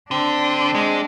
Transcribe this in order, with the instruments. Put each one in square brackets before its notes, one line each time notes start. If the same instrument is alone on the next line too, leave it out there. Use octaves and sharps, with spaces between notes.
[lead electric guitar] D3 [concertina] C4 [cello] D4
[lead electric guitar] G#3